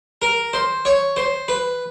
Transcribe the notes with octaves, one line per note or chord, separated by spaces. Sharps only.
A#4
C5
C#5
C5
B4